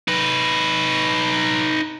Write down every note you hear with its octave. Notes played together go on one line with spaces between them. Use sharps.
D#4 B4